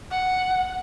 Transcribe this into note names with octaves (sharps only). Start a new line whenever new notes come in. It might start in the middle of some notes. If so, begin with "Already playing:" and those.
F#5